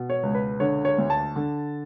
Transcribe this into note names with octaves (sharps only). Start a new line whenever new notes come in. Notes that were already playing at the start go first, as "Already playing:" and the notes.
Already playing: B2
C#5
C#2
B4
D3 C#5
C#5
D2
A5
D3